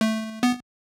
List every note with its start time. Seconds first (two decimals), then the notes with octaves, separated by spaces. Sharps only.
0.01 A3
0.43 B3